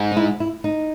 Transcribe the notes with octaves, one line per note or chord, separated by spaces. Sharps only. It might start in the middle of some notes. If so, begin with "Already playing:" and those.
Already playing: G#2
D#4
E4
E4
D#4